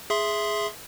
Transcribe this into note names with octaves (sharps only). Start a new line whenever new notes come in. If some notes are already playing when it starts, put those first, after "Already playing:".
G#4 E5 C6